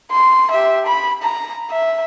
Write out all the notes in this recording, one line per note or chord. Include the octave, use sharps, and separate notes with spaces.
C6
G4 E5
B5
A#5
E5